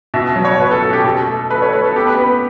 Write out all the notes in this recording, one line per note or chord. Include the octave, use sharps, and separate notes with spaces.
B2 E5
F#3
C#5
B2 B4
A4
B2 A4
G4
B2 A4
A3
A3 B4
C#5
A3 B4
A4
B3 G4
B4
B3 B4